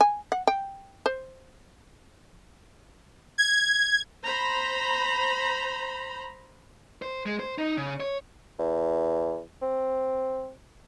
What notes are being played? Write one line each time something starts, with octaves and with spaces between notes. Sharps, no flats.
G#5
F#5
G5
C5
G#6
C5 A#5 B5
C5
G#3
C5
D#4
C#3
C#5
E2
C4